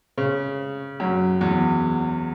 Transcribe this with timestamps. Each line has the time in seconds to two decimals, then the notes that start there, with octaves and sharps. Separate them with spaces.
0.18 C#3
1.00 F#2
1.41 E2